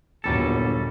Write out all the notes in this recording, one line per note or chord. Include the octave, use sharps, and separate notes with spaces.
G1 D#2 A#2 F#3 G3 A4